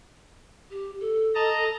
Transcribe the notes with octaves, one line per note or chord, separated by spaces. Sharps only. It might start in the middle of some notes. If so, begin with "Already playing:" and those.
G4
A4
D#5 A5 A#5